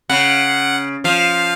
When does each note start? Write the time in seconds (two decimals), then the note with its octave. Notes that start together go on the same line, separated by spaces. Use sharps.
0.09 C#3 F#5
1.04 F3 F5